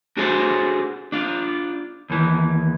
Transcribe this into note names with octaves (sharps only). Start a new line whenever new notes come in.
D4 F#4 G#4 A4 C5
D4 F4
D#2 E3